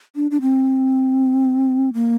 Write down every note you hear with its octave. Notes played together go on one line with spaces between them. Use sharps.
D4
D4
C4
A#3